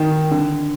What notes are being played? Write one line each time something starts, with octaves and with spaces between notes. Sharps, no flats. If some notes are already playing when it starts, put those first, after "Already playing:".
Already playing: D#3
D3